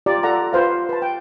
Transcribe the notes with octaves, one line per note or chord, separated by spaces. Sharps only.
F4 G4 D5 A#5
F4 A4 D5 F#5 A#5
F4 B4 C5 F5
B4 A5
G5